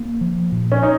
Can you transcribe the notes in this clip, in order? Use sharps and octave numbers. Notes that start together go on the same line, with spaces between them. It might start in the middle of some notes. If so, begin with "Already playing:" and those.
Already playing: A#3
F3
A#2
C#4
D#4